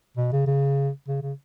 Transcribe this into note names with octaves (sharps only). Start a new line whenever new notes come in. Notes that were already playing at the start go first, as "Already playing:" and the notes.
B2
C#3
C#3
C#3
C#3